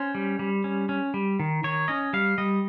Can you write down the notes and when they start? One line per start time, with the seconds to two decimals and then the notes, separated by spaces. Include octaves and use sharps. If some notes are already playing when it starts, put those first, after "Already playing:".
Already playing: C#4 C5
0.15 G3
0.39 G3
0.64 C#4
0.89 C#4
1.14 G3
1.39 D#3
1.64 D#3 C#5
1.88 C#4 D#5
2.13 G3 F5
2.38 G3 D#5